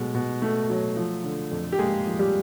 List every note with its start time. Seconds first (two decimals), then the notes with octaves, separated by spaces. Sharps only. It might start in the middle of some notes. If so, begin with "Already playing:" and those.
Already playing: B2 F#3 G#3 A3
0.15 B2
0.42 A3
0.70 F#3
0.96 F3
1.24 D3
1.51 F2
1.72 G4
1.79 G#3 A#3 G#4
2.06 F3
2.19 G3 G4